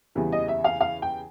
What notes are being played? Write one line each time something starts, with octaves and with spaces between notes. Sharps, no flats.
E2 C#3 E3 G3
D#5
E5
F5
F5
G5